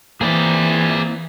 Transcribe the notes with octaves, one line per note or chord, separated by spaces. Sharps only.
E3 A#3 C4 E4 G#4 D5